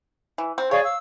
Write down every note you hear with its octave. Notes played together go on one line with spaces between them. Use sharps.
E3
C4
G#4 C#5 D5 F5
F5 E6